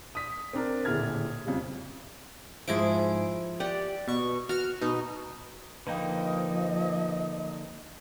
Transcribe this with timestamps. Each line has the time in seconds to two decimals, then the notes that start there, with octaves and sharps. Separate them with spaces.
0.15 D#6 B6
0.53 C4 D4 A#4
0.85 D#1 A2 D3 G#4 F6 G#6
1.45 F2 C#3 G3
2.68 G#2 F3 E4 G#4 D7
3.60 G4 D5 F#5
4.08 B2 C#6
4.49 F#4 F6
4.81 B2 D#4
5.87 D3 F3 A#3 D#4 B4 D#5 F5 G5